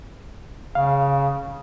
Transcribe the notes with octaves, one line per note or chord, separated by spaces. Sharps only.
C#3 F5